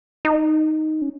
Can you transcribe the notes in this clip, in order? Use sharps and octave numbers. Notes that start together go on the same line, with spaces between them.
D#4
C#4